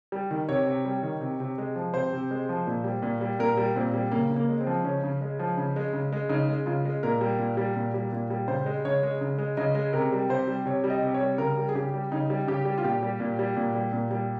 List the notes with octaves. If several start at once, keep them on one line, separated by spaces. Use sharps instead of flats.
G3
D#3
C3 C#5
C3
G3
D#3
C3
C3
G#3
F3
C3 C5
C3
G#3
F3
A#2
G3
A#2
G3
A#2 A#4
G3
A#2 C4
G3
C#3 A#3
C#3
A#3
G#3
C4
F3
C#3 C#4
C#3
G#3
F3
C#3
G#3
C#3
G#3
C#3 D#4
G#3
C#3 F4
G#3
A#2 A#4
G3
A#2
G3
A#2
G3
A#2
G3
C#3 C5
G#3
C#3 C#5
G#3
C#3
G#3
C#3 D#5
G#3
C3 A#4
G3
C3 C5
G3
C3 C#5
G3
D#5
C3
C#5
G3
C#3 A#4
G3
G#4
C#3 G4
G3
C#3 D#4
G3
C#3 G4
G3
F4
A#2 G4
G3
A#2
G3
A#2
G3
A#2
G3